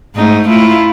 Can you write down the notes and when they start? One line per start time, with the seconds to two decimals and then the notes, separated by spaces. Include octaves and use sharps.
0.16 G#2 A3 D#4
0.48 A3 E4 F4